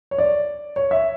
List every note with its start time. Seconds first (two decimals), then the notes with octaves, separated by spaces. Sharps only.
0.11 C#5
0.18 D5
0.76 C#5
0.91 E5